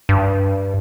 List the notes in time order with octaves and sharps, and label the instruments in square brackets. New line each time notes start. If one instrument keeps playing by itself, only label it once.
[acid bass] G2